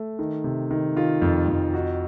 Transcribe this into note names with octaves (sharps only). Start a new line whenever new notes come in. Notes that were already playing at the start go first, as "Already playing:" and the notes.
Already playing: A3
D#3
C3
D#3
D#3 F4
F2
F2
D#4 F#4